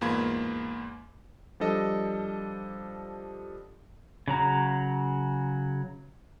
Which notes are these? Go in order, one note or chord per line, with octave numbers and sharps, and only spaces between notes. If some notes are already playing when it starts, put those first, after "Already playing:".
E2 G#2 A#3 F4 B5 G#6
F3 G3 D4 A4 D#5
C#3 F#3 A#5